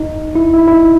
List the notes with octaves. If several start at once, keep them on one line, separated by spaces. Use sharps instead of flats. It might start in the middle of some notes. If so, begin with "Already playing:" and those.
Already playing: D#4
E4
E4
E4
D#4